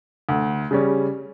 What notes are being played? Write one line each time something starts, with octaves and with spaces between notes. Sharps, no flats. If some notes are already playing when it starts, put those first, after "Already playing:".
D2
C#3 G3 C#4